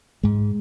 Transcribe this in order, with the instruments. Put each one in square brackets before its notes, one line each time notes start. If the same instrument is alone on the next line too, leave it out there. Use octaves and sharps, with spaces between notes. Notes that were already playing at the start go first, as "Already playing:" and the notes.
[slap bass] G#2 G#3